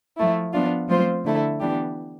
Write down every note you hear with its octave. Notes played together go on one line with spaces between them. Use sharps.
F3 A3 E4
F3 B3 D4 F4
F3 A3 C4 F4 C5
D3 A3 E4 A4
E3 B3 D4 G4